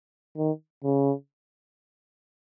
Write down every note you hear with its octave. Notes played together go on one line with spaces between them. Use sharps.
D#3
C#3